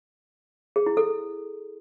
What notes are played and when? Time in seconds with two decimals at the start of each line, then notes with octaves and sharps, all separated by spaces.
0.76 G#4
0.86 E4
0.97 A4